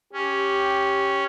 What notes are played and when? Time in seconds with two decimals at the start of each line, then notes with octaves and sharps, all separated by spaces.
0.13 C#4 G4